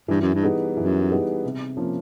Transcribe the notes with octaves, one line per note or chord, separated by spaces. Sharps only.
G2 E3
F#2
G2
G3 B3 D#4 G#4
F#2 E3
G3 B3 D#4 G#4
C3
F3 A#3 C#4